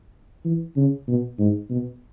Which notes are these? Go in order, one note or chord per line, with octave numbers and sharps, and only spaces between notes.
E3
C#3
B2
G#2
B2